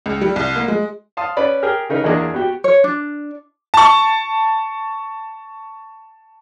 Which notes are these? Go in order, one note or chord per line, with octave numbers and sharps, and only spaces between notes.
C#2
G3
C2
A#3
G#3
F5 A5 C6 D#6
C#4 B4 D5 B5
G4 G#4 A#4 F6
C#3 D#4 A#4 B4
E2 A#3 D4 G#4 D#5 D6
B3 F#4 G4
C#5
D4
A5 C#6